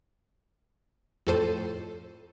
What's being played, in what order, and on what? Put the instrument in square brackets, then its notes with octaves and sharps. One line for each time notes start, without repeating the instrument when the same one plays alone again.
[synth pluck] F2 A2 A4 C5 D#7